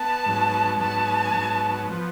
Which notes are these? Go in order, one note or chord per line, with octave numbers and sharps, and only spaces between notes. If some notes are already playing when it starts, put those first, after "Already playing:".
Already playing: B3 A5
G#2 F#3 B3
G#2 F#3 B3 A5
G#2 F#3 B3
F3 B3